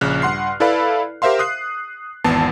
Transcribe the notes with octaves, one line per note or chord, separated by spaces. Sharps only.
A#1 C#3 F6 F#6
G2 F#5 C6 C7
E4 A4 B4 D5 F5 B5
G4 A#4 C5 E5 F5 C6
D#6 F#6 C7
G#1 E2 B3 A5 C7